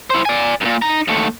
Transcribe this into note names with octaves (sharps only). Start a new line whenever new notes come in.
E4 C5
D5 G#5
F#2 A#2
D#4 A#5
D#2 A3